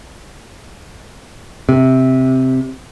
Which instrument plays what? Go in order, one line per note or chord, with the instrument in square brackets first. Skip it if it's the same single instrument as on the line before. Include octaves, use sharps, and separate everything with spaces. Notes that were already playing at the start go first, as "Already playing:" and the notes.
[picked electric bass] C3